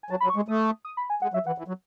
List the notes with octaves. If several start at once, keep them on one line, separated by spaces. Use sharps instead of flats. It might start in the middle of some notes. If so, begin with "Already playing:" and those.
G#5
F#3 A5
B5
F#3
C#6
G#3
A3 D#6
D#6
B5
G#5
G#3 F#5
F#3 E5
E3 F#5
E3
F#3